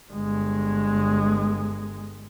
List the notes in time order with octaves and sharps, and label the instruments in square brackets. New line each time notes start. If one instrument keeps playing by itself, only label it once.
[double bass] G1 G#3